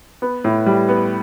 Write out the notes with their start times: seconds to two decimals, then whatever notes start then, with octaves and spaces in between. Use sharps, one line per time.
0.22 B3
0.44 A2
0.66 G3
0.89 B3